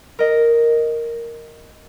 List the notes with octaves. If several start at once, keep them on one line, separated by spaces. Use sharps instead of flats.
A#4 D#5